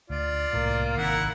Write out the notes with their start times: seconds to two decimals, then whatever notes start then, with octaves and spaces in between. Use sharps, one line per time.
0.10 D2 F4 D5
0.53 C2 A2 A#3
0.98 G#1 C3 D#3 E4 F#5 A#5